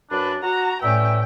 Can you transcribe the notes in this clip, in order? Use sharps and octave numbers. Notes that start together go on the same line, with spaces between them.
F#2 D4 B4
F#4 A#5
A2 C#4 B4 D5 E5 G5